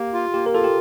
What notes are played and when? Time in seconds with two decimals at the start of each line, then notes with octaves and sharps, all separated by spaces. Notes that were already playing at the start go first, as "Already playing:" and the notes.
Already playing: A#3 G4
0.13 F4
0.34 A#3 G4
0.46 A#4
0.54 F4 A4
0.64 G4